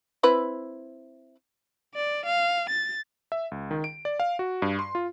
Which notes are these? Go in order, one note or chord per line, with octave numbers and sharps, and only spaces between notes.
C4 E4 B4
D5
F5
A6
E5
C#2
D#3
D7
D5
F5
F#4
G2
C6
F4